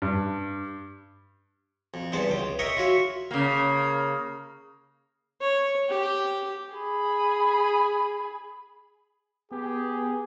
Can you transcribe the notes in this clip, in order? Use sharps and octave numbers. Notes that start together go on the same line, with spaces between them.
G2
F2
E2 G2 B3 C5 A5
C#2 G5
A#4 C#5 D#5 E5 G5
F4 F#4 C#5 E5
C#3 A#3
C#5
G4
G#4 B5
B3 G4 G#4